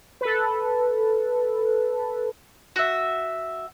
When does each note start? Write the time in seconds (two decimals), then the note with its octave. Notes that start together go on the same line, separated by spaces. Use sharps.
0.21 A4 B4
2.76 F#4 E5